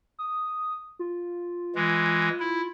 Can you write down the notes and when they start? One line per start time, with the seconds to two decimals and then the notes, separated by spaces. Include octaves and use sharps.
0.19 D#6
0.99 F4
1.75 E3 G#3
2.40 E4